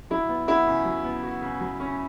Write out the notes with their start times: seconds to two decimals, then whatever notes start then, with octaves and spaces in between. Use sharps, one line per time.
0.10 F#3 E4
0.29 B3
0.47 E4 F#4
0.67 C#3
0.85 F#3
1.04 B3
1.23 F#4
1.42 C#3
1.60 F#3
1.80 C#4